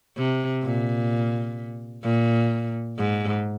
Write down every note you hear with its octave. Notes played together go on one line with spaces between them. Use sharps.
C3
A#2
A#2
G#2